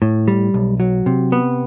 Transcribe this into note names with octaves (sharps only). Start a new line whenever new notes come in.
A2
G3
B1
F#3
C3
B3